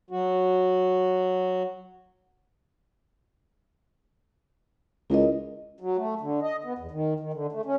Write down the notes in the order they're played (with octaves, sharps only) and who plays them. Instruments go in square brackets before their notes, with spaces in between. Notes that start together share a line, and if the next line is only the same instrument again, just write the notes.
[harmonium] F#3 F#4
[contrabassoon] C#2 [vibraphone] E4 A#4 D#5
[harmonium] F#3
A3
D3
D#5
B3
E2
D#3
D#3
D3
A3
C#4